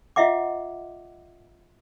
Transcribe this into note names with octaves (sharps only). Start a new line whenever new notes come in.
F4 D#5 E5 F#5 D6